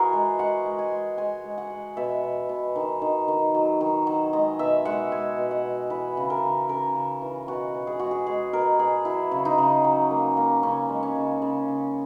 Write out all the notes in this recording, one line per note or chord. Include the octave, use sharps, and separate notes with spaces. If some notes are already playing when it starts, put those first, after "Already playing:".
Already playing: E3 F#4 G#4 A#4
G#3
G#3 F#5
G#3
G#5
G#3
G#3 G#5
G#3
F#5
G#3
B2 E5
B2
B2
D#3
D#3
D#3
F#3
D#3
F#3
G#3 D#5
B2 E5
G#3 F#5
G#3 G#5
B2
F#5
B2
E3 B4
C#3
A#4
C#3
C#3 A#4
C#3
E3
B2 F#4
B2
G#4
G#3 F#4
G#4
G#3 G#4
B2 A#4
B2 G#4
F#3 E4
C#3
D#4
C#3
F#3
A#3
A#3
C#3 C#4
G#3
C#4
C#3
C#3
C#3